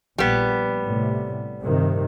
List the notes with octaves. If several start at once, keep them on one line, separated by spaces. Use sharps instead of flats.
A#1 G3 B3
A2 C3
G2 C3 D#3